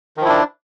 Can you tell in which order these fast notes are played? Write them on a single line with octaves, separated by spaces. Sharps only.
D#3 F3 E4 D4